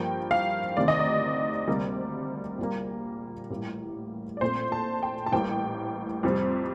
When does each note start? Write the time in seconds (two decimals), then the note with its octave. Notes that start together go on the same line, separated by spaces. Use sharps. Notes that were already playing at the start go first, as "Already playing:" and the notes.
Already playing: G2 F3 A#3 G5
0.31 F5
0.77 D2 C3 D#3 D5
0.88 D#5
0.99 D5
1.68 D2 C3 G3 A#3
2.58 A#1 A#2 G3 A#3
3.50 A1 A2 G3 A#3
4.37 D5
4.41 A#1 A#2 A3 C4 C5
4.72 A5
5.03 G5
5.26 A5
5.32 A1 A2 G3 A#3 G5
6.23 F2 C3 G3 C4